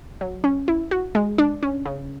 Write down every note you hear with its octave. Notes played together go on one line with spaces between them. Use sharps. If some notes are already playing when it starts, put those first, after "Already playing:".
F#3
C#4
E4
F#4
G#3
D4
C#4
C#3